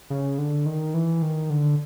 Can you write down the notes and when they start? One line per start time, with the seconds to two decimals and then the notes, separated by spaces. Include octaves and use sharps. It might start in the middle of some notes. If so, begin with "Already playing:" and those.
0.10 C#3
0.38 D3
0.66 D#3
0.94 E3
1.22 D#3
1.50 D3